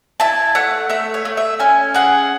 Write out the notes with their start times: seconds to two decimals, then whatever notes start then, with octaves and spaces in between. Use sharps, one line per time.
0.20 E4 A5
0.55 A3 F#5
0.90 A3 E5
1.14 C#5
1.25 A3
1.37 E5
1.59 C#4 G#5
1.95 G#4 F#5